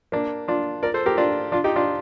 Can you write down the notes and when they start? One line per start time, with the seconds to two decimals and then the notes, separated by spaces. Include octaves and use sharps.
0.12 A#3 D4
0.48 D4 F4
0.83 A#4 D5
0.94 A4 C5
1.06 G4 A#4
1.18 D4 F4
1.52 D4 F4
1.64 D#4 G4
1.76 D4 F4